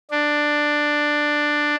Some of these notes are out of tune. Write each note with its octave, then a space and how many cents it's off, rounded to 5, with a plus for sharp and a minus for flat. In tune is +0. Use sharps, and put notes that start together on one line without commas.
D4 +10